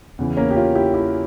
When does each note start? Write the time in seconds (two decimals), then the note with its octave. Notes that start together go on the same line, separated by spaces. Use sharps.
0.19 E2 C#3 E3
0.37 A#3 C#4
0.51 G4
0.56 C#4 F4
0.75 E4 G4
0.94 E4 G4